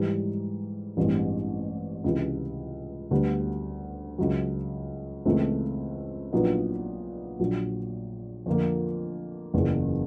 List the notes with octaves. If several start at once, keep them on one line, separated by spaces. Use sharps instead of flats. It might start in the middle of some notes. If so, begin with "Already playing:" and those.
Already playing: G#2 E3 G3
A1 G2 E3 G#3 C4
C#2 C3 E3
D2 D3 G3 B3
C#2 C#3 F#3
C#2 C#3 E3 A3 C4
A#1 A#2 F#3 B3 D#4
A#1 A#2 F#3
F2 D3 F3 A#3
F#1 E2 C#3 E3